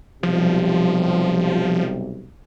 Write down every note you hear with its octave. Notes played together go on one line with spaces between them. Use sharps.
B1 C3 F3 G3